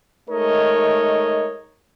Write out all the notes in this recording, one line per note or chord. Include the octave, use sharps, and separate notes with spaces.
G#3 A3 D#4 A#4 C#5 D#5